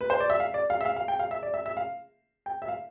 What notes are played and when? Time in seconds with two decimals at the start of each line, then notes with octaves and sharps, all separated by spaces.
0.01 B4
0.10 C5
0.20 D5
0.30 E5
0.40 F5
0.54 D5
0.70 F5
0.81 E5
0.85 F5
0.96 F5
1.08 G5
1.19 F5
1.31 E5
1.43 D5
1.54 E5
1.66 E5
1.77 F5
2.46 G5
2.62 E5
2.68 F5